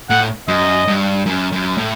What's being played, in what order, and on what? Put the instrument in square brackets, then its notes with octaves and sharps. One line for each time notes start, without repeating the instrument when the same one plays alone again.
[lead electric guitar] A2 [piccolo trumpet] F#5
[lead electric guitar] F#2 [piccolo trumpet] D#5
[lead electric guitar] G2
F#2
F#2
A2